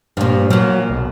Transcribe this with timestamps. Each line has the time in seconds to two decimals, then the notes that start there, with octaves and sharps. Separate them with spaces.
0.17 G2 A#2 F3
0.50 A#2 F3 F#3
0.90 B1